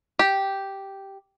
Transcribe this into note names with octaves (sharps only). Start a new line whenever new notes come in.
G4